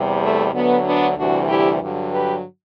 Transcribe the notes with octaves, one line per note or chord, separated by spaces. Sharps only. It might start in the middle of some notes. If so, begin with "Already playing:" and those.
Already playing: E2 C3 G3
A3
D2 D3 F#3 B3
B3 D4
D2 C3 E3 G3 D4 F#4
E4 G4
G2 D3 F#3
G4 B4